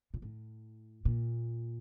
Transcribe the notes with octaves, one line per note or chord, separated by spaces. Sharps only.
A#2
A2
A#2